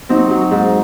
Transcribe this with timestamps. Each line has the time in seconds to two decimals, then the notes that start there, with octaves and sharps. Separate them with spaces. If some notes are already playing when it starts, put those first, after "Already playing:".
0.09 F#3 C4 D#4
0.30 F#3
0.51 G#2